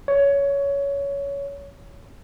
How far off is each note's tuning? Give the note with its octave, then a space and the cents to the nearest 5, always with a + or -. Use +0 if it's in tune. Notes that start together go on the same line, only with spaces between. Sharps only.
C#5 +15